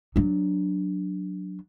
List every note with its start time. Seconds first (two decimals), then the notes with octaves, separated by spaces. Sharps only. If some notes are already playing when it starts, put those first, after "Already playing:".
0.16 F#3 D4